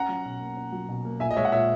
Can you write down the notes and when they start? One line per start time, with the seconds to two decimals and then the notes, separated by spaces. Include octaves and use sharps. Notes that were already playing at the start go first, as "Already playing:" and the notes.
Already playing: C#4 F#5 A#5
0.09 F#3
0.25 B2
0.41 A#3
0.57 C#4
0.72 F#3
0.89 B2
1.05 A#3
1.20 A#2 E5 G#5
1.31 D#5
1.36 G#3 C#5 E5
1.45 F#5
1.52 A#2 C#5 E5